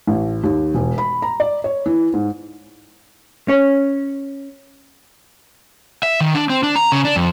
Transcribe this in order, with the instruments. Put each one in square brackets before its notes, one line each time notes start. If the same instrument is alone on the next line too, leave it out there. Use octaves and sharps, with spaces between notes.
[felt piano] A1
D#2
E1
B5
A#5
D5
C#5
E3
G#2
[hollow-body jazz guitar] C#4 C#5
[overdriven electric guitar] E5
D#3
D4
C4
D4
A#5
C#3
D4
F2